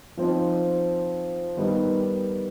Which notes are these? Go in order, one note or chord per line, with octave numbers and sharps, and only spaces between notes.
F3 C4 D#4
D#3 G3 B3 D#4